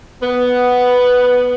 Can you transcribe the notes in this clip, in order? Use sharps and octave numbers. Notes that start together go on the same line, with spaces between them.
B3